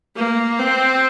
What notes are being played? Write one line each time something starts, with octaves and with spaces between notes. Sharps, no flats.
A#3
C4